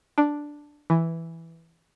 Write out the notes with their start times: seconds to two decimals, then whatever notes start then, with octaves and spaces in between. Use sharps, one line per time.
0.18 D4
0.90 E3